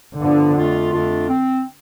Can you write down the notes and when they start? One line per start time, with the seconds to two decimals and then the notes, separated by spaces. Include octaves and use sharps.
0.19 G2 D3 F3 B3 F4
0.56 F2 D3 A3 D4 F4
0.92 F2 D3 A3 D4 F4
1.29 C4